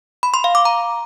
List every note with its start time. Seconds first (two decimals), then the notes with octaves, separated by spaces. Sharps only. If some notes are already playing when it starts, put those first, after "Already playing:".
0.23 B5
0.34 C6
0.44 F5
0.55 D6
0.65 A#5